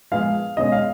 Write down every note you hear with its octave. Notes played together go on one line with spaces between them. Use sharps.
A#2 F3 G#3 B3 F5
B2 G#3 C#4 D#5
F5